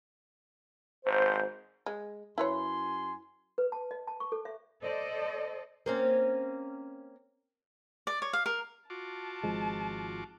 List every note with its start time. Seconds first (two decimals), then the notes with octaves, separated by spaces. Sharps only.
1.06 G#1 C5
1.86 G#3
2.38 F#2 E4 B4 C#5 G#5 C6
3.58 B4
3.72 A5
3.91 D#5
4.08 A5
4.20 C#6
4.32 A4
4.45 E5
4.81 A4 C5 D5 D#5
5.86 A#3 C4 C#4
8.07 D5
8.22 C#5
8.33 F5
8.46 A#4
8.90 F4 F#4 A5 D6
9.43 G#1 F3 G#3